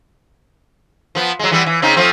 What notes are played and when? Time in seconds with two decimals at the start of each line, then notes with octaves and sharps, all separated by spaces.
1.15 F3 B3
1.39 F#3 G#3
1.51 E3 G3 B3
1.66 E3
1.82 C#3 C4 D#4
1.97 F3 A3 C4